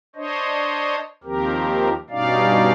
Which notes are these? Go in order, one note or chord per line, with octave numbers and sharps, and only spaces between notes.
D4 C5 C#5 D#5
D#2 D#3 F3 C4 G4 A#4
G2 B2 C#4 D#4 D5 F5